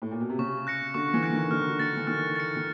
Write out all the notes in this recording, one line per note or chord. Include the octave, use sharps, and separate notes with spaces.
A2
A#2
B2
C3
C#3 C#6
F#6 A#6 C#7
D3 C#6
E3
F#6 A#6 C#7
D#3
D3 F6
D#3
D3
D#3 A6 C#7
E3
D#3 F6
A6 C#7
D#3